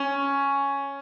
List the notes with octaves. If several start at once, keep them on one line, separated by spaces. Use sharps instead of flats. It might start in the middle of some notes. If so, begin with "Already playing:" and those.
Already playing: C#4